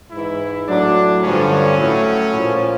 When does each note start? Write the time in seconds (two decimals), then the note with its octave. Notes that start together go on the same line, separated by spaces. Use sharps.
0.11 G#2 E3 E4
0.67 A2 F#3 D4
1.23 G2 D3 F3 C#4
1.78 A2 F#3
2.34 A#2 F3